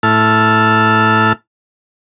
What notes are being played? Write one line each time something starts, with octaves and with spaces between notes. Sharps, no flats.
A2 E4 A5 F6